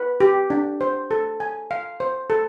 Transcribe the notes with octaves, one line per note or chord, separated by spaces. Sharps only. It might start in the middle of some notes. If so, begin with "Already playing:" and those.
Already playing: B4
G4
D4
C5
A4
G#5
F5
C5
A4